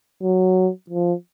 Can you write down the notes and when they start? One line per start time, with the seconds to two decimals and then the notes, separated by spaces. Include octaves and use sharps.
0.23 F#3
0.90 F3